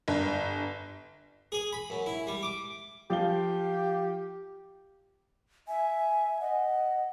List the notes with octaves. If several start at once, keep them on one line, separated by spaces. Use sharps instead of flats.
G1
G#4
B5
F#2
E4
G3
D6
F3 G4 F5 G7
E5 G#5
D#5 F#5